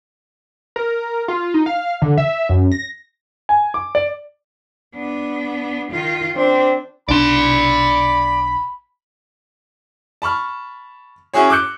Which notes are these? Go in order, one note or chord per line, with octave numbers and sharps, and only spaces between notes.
A#4
F4
D#4
F5
D3
E5
F#2
A#6
G#5
D6
D5
B3 D4
D#3 F4
C4 D4
B1 D4 D5 B5 C6
A5 B5 C#6 F6
C#4 E4 F#4 G#4 C#5
D6 E6 F#6 G6 C#7